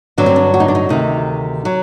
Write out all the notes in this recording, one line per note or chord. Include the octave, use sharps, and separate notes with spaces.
G2 D3 F#3 D4
C4
D4
F#4
D#4
D4
D#4
D2 C3 D#3 D#4
F#3